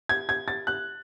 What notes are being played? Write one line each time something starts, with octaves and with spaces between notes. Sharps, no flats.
G#6
G#6
A6
F#6